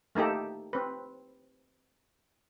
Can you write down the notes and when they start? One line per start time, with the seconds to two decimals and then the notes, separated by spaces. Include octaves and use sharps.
0.15 A3 A#3 D#4 G4 A4
0.73 C4 B4